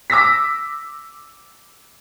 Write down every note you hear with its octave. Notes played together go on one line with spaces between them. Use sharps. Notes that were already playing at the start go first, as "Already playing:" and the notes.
D6 E6 A#6 B6